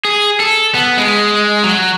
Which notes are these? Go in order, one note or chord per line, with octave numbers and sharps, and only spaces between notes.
G#4
A4
B3
G#3
F#3